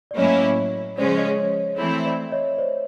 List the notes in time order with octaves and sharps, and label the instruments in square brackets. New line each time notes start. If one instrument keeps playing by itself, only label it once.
[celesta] D5
[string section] A2 F#3 A#3 C#4 E4 [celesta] C#5 D#5
[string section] C#3 F3 G#3 C#4 [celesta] C5 D5
[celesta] C#5 D#5
C#5
[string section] E3 A3 C4 E4
[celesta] D5 E5
C#5 D#5
C5 D5